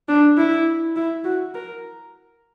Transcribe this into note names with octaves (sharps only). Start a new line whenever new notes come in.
D4
E4
E4
F#4
A#4